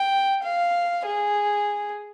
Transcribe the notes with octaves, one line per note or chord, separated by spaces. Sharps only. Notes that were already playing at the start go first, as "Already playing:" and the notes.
Already playing: G5
F5
G#4